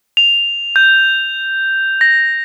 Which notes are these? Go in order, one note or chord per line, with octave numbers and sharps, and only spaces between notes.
F7
G6
A#6